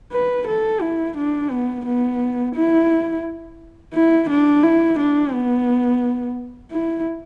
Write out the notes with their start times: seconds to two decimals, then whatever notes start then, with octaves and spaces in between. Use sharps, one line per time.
0.13 B4
0.48 A4
0.82 E4
1.17 D4
1.51 B3
1.86 B3
2.56 E4
3.94 E4
4.30 D4
4.63 E4
4.99 D4
5.34 B3
6.72 E4